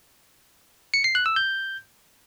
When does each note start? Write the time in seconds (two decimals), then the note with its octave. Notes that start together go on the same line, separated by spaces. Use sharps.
0.94 C#7
1.04 C7
1.15 F#6
1.26 E6
1.36 G6